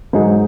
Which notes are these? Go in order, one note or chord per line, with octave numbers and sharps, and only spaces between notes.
G#2 F#3 D#4 G#4